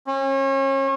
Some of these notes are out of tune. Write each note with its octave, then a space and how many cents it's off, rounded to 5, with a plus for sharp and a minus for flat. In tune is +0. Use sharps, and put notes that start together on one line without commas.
C#4 -35